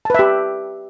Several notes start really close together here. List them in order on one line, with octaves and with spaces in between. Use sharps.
A5 B4 E5 G4